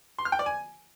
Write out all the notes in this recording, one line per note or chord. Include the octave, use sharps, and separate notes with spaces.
C6
F6
G5
D5
G#5